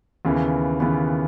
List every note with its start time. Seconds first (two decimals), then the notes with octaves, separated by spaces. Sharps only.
0.25 D#2 C#3 E3 B3
0.80 D#2 C#3 E3 B3